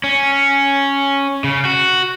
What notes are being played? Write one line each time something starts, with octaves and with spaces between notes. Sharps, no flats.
C#4
C#3
F#4